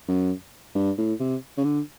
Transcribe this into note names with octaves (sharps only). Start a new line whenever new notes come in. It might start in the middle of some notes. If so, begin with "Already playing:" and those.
F#2
G2
A2
C3
C#3
D3